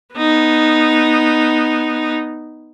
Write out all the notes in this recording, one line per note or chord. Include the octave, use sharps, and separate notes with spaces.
B3 D#4